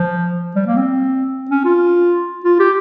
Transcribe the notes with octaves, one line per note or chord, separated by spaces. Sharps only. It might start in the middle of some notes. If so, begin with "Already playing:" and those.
Already playing: F3
G3
A#3
C4
C#4
F4
F4
G4